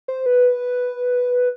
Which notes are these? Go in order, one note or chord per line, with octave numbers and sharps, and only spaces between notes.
C5
B4